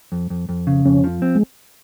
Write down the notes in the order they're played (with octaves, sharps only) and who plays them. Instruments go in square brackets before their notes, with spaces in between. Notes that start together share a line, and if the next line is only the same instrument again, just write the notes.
[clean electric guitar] F2
F2
F2
C#3
[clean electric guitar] F2 [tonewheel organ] C#4
[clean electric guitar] F3
C4
[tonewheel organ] G#3